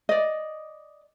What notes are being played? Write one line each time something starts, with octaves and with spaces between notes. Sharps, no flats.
D5 D#5